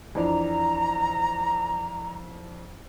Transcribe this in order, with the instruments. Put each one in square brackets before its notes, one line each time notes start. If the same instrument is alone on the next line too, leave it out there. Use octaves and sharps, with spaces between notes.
[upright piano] F2 E3 D4 [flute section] A#5